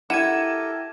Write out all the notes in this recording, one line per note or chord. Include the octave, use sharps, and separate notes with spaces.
E4 G4 A4 A#4 F#5 G#6 D#7 E7